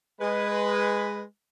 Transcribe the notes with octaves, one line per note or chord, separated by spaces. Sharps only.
G#3 B4